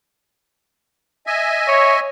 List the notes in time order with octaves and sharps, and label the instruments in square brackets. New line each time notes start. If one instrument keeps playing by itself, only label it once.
[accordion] D#5 E5 G#5
[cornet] C#5